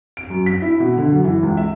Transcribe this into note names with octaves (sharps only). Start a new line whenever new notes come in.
D7
F#2
B6
E4
B2
D3
F#2
E3
C#2
E5